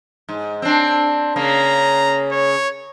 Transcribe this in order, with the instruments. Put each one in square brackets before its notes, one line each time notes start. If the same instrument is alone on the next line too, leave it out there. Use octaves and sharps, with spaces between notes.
[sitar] G#2
C4 D4
[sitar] C#3 A#3 [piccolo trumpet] A#5
[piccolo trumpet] C#5